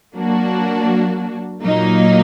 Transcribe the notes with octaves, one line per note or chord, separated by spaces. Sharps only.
F#3 A#3 D4 F#4
A#2 F#3 A#3 D#4